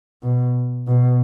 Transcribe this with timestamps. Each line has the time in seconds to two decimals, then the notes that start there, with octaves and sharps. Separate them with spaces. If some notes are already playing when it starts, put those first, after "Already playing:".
0.23 B2
0.88 B2